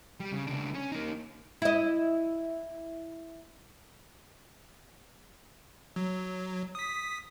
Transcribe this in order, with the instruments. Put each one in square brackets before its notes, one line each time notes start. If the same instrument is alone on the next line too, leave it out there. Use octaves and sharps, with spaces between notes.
[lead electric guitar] G3
C#3
C#2 D4
C#4
A#3 D#4
[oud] E4 D#5
[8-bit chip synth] F#3
D#6 B6